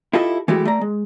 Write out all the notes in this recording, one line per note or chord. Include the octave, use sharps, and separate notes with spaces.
E4 F4 G4 A4 D#5 E5
E3 G#3 A3 E4 F#4 G4
A3 D5 A#5
G#3